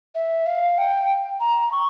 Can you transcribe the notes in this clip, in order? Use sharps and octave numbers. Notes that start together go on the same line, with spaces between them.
E5
F5
G5
A#5
C#6